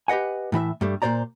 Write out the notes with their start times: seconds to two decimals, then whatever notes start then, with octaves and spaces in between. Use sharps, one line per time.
0.08 G4 B4 D#5 F#5 G#5
0.52 A2 E3 E4 E5
0.81 G2 G3 A3
1.02 A#2 C#3 C5 D5 A#5